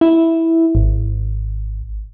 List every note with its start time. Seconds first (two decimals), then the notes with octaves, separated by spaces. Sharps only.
0.01 E4
0.75 G#1